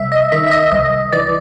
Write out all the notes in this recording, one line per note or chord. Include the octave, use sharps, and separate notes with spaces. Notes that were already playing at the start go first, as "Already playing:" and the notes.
Already playing: C2 E5
D#5
D#3 E5
E5
D#5
C2 D#5
E3 D5